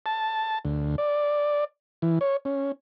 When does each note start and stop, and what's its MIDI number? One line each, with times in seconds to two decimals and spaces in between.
0.06 0.59 81
0.65 0.96 38
0.98 1.64 74
2.02 2.19 52
2.21 2.37 73
2.45 2.72 61